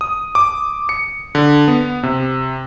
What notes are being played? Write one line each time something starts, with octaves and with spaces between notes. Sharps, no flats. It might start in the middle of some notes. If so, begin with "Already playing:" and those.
D#6
D6
C#7
D3
B3
C3